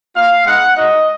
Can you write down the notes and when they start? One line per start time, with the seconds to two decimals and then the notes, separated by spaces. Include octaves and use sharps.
0.16 A#3 F4 F5
0.46 G#3 B3 D#4 F#5
0.76 G#3 D#4 F#4 D#5